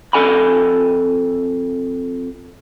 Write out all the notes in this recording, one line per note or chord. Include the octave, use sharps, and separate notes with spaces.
F2 A4 G#5 B5